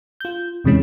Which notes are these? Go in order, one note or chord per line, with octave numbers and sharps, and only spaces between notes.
F4 G6
E2 C3 E3 G#3 C#4